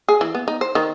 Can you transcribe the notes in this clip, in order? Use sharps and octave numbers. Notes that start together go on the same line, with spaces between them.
G#4
E3
B3
D#4
C5
D#3